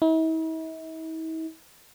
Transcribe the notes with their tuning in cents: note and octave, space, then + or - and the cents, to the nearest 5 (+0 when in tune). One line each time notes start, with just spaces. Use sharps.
E4 -45